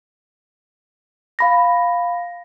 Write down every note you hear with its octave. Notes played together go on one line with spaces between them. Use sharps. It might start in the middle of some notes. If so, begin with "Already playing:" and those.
F5 B5 A#6